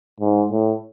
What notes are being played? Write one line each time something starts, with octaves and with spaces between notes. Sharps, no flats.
G#2
A2